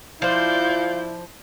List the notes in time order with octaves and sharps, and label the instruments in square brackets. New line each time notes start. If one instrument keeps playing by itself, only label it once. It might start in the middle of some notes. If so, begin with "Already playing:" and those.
[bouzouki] F3 C5 [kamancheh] E4 [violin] D5 G6 [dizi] F5